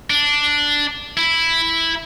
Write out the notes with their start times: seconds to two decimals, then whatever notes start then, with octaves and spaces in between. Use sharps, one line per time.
0.10 D4
1.17 E4